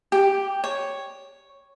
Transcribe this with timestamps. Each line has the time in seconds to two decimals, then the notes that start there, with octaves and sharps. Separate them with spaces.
0.12 G4
0.64 C#5